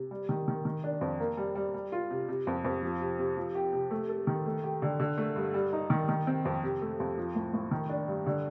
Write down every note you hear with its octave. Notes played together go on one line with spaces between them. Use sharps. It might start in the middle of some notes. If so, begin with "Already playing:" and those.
Already playing: C3
G3
D#3
D#3
D#3
D4
F2
A#3
G3
G3
G3
F4
C3
C3
F2
F2
F3
C3
C3
F3
G4
C3
A3
A4
D#3
A3
G4
D3
D3
A3
G2
G3
D#4
D#3
D#3
C4
F2
C3
A3
F2
F3
A2
A2
D#3
D4
G2
D3